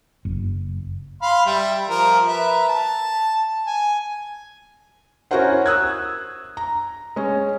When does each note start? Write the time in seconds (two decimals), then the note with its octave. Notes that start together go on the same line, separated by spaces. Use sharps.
0.25 F#1
1.22 F5 B5 C6
1.46 G3 E5
1.89 F3 A#4
2.27 B4 E5 A#5
2.68 A5
3.67 G#5
5.31 C#4 E4 F#4 A#4 C5 F#5
5.66 D#6 E6 F#6 G#6
6.57 A#5
7.16 G#3 C#4